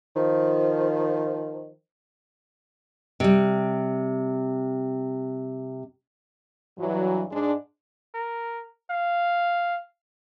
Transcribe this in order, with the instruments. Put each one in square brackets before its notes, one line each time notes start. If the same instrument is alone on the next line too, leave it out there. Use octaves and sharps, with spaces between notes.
[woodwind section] D#3 F3
[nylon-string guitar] C3 G3
[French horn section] G2 E3 F#3
G#2 G#3 D4
[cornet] A#4
F5